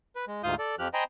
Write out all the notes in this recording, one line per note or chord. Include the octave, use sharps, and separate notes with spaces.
B4
G#3
D2 G#2 F4 F5 D#6 G6
A4 D5
F2 F3 G4 F6 F#6
C5 D#5 G5 G#5 A#5 B5